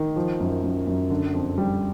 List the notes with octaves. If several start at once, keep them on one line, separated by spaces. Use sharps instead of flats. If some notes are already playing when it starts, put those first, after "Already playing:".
Already playing: D#3
F3
F#2
F#2
F#2
D3
F2
G3